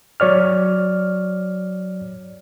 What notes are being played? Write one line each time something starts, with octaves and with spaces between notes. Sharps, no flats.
F#3 C#5 D5 F6